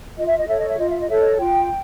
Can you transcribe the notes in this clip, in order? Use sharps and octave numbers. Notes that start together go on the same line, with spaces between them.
F4 D#5
E5
D#5
A4 C#5 E5
D#5
E5
F4 D#5
E5
D#5
A4 C#5 E5
D#5
F4 G5